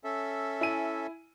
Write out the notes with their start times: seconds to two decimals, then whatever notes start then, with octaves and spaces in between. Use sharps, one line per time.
0.04 C#4 A4 E5
0.61 E4 G#5 D#7